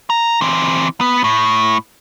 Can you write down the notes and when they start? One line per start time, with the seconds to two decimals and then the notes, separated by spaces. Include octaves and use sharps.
0.10 A#5
0.41 E3 C4
1.01 B3
1.24 A2